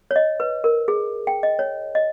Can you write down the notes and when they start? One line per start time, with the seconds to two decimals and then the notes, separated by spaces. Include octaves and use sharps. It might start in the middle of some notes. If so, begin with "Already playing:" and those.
0.11 C#5
0.16 D#5
0.40 B4
0.64 A#4
0.88 G#4
1.27 G5
1.43 D#5
1.59 C#5
1.95 D#5